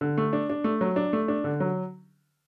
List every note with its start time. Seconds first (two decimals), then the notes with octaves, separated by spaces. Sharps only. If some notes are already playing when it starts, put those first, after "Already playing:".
0.01 D3
0.18 A3
0.33 D4
0.50 D4
0.64 A3
0.81 F#3
0.96 D4
1.13 A3
1.28 D4
1.44 D3
1.60 F#3